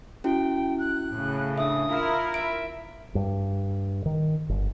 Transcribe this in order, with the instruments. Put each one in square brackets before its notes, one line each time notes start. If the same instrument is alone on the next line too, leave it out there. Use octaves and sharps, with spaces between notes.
[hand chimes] C#4 E4 F#4 [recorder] G5
[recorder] F#6
[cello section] A2 C#3
[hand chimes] D4 E5 [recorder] D#6
[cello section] E4 F4 A#4 [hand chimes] F5 F6
[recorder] E5 [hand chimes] D7
[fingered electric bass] G2
D#3
G1